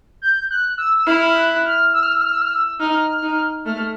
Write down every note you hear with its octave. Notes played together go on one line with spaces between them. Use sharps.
G6
F#6
E6
E6
E4 F6
F#6
F6
E6
F6
E6
F6
E6
F6
E6
D#4 F6
D#4
A3 F6